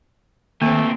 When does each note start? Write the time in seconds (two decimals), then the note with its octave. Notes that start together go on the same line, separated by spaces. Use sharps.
0.62 A#2 D#3 A3 A#3 C4